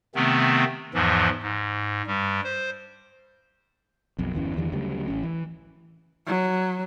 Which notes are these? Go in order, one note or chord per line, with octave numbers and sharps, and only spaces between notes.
C3 D#3 A3 B3 C4
E2 G#2 E3 F3
G#2
G2 G3
C5
B1 F2
G1 E2 E3 C#4
E2 G2 D#3 E3
D2 C#3 F#3 G3
A1 C#4
E3
F#3